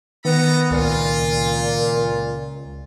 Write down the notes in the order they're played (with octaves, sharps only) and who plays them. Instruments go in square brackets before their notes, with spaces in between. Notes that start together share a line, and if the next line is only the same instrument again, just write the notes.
[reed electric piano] D#3 [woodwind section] B3 [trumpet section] A4 D#5 A#5
[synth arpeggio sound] C#2 [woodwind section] A#2 [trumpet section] F4